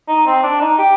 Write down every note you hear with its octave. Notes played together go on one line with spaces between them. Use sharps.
D#4
C4
D4
D#4
G4